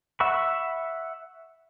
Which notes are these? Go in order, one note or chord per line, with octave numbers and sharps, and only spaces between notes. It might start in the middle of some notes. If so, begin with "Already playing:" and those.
E5 F#5 B5 C#6